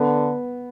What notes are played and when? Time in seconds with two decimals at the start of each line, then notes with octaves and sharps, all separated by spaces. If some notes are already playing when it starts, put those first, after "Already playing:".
Already playing: D3 B3